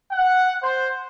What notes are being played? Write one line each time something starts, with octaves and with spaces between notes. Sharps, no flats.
F#5
C5